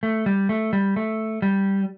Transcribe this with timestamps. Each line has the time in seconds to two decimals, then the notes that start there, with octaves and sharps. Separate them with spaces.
0.03 A3
0.26 G3
0.49 A3
0.73 G3
0.96 A3
1.42 G3